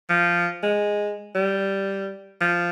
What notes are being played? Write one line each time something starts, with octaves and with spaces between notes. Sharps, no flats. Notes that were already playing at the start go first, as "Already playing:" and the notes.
F3
G#3
G3
F3